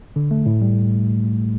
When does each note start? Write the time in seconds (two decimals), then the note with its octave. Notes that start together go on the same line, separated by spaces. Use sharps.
0.16 D3
0.31 A3
0.46 A2
0.62 G3